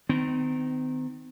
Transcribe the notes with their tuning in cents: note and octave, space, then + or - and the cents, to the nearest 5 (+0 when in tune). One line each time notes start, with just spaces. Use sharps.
D#3 -10 C4 -45